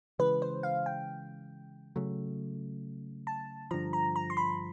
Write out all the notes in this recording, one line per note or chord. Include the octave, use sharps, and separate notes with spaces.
C#3 E3 G#3 B4
C5
F5
G5
C#3 F#3 A3
A5
G2 D3 F3 A#5
A#5
A#5
C6
B5